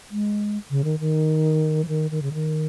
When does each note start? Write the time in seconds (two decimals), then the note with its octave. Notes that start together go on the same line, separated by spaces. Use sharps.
0.11 G#3
0.70 C#3
0.84 D#3
1.00 D#3
1.85 F3
1.88 D#3
2.11 D#3
2.22 C#3
2.33 D#3